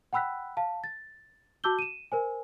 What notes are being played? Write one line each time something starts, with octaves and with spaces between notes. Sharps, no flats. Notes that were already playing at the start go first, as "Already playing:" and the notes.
F#5 G5 B5 E6 F#6 B6
F5 A5
A6
F#4 A5 D6 E6 G6 G7
D#7 E7
A#4 C5 G#5